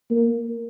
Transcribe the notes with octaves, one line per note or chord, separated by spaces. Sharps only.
A#3